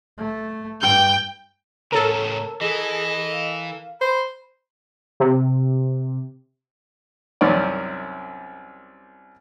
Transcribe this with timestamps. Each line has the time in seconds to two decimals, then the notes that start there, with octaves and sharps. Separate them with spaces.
0.18 A3
0.81 G2 G5 G6
1.92 A2 C#3 A4 A#4 C#5
2.61 E3 G#4 D#5
3.31 F5
4.01 C5 B5
5.20 C3
7.41 C2 F#2 D#3 C#4 D5